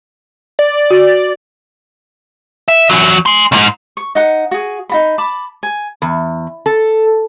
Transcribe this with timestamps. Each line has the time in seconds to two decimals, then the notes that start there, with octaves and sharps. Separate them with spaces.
0.59 D5
0.91 F#4
2.68 E5
2.90 E2 F#3
3.26 G#5 C6
3.52 C2 G#2
3.97 C#6
4.15 D#4 F#5
4.51 F#4 G#4
4.89 D#4 F#4 B5
5.18 A5 B5 D6
5.63 G#5
6.02 E2
6.66 A4